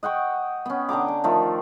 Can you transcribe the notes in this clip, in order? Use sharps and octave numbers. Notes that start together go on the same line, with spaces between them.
D#5 F#5 G5 C#6
B3 C#4
D3 G5 A#5 D6
G#5
D#3 F3 A3